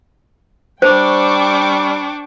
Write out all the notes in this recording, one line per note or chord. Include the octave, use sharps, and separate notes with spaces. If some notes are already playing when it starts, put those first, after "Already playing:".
G3 D4 C5 G5 C#6 D6